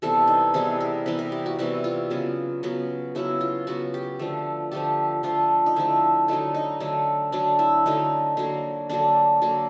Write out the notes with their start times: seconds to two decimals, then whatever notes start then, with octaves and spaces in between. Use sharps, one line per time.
0.02 C3 E3 G3 B3 A4
0.28 D#4
0.54 C3 E3 G3 B3 G#4
0.80 A#4
1.06 C3 E3 G3 B3 B4
1.19 A#4
1.32 G4
1.46 F#4
1.59 C3 E3 G3 B3 F#4
1.84 F4
2.10 C#3 F#3 B3
2.63 C#3 F#3 B3
3.15 C#3 F#3 B3 E4
3.41 F4
3.67 C#3 F#3 B3 F#4
3.94 G4
4.19 D3 F3 A3
4.71 D3 F3 A3 G4
5.23 D3 F3 A3 F4
5.66 D#4
5.76 D3 F3 A3 E4
6.28 D3 F#3 A3 D#4
6.54 D#4
6.80 D3 F#3 A3
7.32 D3 F#3 A3 D4
7.59 E4
7.86 D3 F#3 A3 D#4
8.37 D3 F#3 A#3
8.89 D3 F#3 A#3 D4
9.42 D3 F#3 A#3